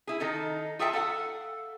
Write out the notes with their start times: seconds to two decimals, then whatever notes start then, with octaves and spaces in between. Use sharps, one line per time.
0.07 E4 G#4
0.20 D#3 D#4 A4
0.79 F4 G#4 A4 E5 G5 A5
0.93 A4 F5 F#5